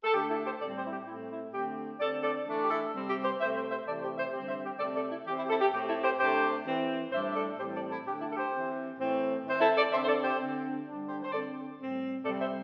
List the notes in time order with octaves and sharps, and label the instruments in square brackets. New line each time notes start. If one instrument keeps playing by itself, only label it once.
[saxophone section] A4
D3 A3 D4 G4
E4 A4
G4 C5
A2 G3 C4 A4 D5
G4 C5
E4
G4
A2 A3 C4 E4
E4
D3 A3 C4 G4
D3 C4 A4 D5
A4 D5
E3 A3 D4
G4
E4 A4
C3 G3 C4
G4
G4 C5
C3 A3 C4 C5 E5
C5 E5
C5 E5
C3 E3 A3 A4 D5
G4 C5
C5 E5
D3 G3 C4 G4 C5
C5 E5
G4
C3 A3 C4 A4 D5
A4 D5
E4
E3 C4 G4
E4
G4
E4 A4
G4
A2 A3 C4 G4
E4 A4
G4 C5
C3 A3 D4 G4 C5
E3 C4
A2 G3 D4 C5 E5
E5
A4 D5
A2 E3 G3 C4 G4 C5
A4 D5
E4 A4
D3 A3 D4 G4
E4 A4
A4
G4 C5
E3 C4
A2 E3 A3 C4
E3 C4 C5
E4 A4
A4 D5
D3 C5 E5
C4
C5
A4 D5
G4 C5
D3 C4
D3 G3 D4
G4 C5
C5
D3 A4 D5
C4
A2 G3 C4
C3 G3 C4 A4 D5
C5 E5